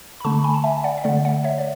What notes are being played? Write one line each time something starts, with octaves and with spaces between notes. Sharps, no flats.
B5
D3 A3 A5 C#6
G#5 B5
A5
E5 G#5
D5 F#5
E5
D3 A3 D5 F#5
D5 F#5
C#5 E5
D5